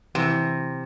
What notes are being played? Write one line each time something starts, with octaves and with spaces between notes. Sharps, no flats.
C3 E3